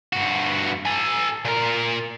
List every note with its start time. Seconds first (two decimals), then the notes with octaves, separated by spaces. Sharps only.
0.13 G2 F#4
0.85 A4 G#5
1.45 A#2 A#4